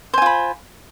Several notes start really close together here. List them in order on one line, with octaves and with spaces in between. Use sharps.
C5 G#5 F4 B5